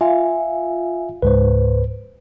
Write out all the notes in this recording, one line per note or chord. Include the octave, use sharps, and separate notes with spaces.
F4 E5 F5 G#5
C#2 G#2 B4 C5